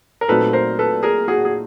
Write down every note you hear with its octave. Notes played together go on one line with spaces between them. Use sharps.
A#4
A#2 F#3 A3 C4 D#4 A4 B4
A#4 C5
A4 B4
G#4 A#4
F#4 G#4
G#4